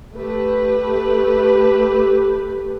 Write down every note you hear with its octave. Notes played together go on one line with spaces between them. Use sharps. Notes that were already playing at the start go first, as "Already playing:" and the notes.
A3 G4 B4